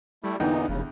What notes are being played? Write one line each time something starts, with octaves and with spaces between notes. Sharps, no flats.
G3 A3 E4
E2 A#2 D3 E3 B3 D#4 G5
F1 D#2 C#3